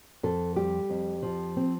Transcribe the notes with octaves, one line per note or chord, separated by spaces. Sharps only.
F2 A4
G3 G4
F2
F3
C4